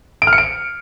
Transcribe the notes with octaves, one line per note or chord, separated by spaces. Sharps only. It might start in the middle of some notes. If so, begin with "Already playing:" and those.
D7
F6
C#7
D7